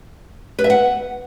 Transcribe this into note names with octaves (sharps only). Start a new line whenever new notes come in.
B4
E5
F#5